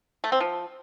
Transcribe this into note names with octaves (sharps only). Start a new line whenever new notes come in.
A3
C4
F3